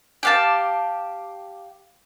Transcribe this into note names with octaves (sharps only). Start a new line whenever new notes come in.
G4 F5 A5